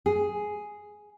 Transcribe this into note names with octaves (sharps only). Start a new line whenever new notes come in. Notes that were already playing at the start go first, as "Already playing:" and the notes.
G#4